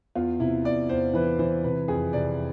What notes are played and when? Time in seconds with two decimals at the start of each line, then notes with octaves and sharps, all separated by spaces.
0.15 E2 F4
0.40 C3 E4
0.64 E2 D5
0.89 E2 C5
1.14 E3 B4
1.39 E3 C5
1.64 C3 B4
1.88 F2 G#4
2.13 C3 D5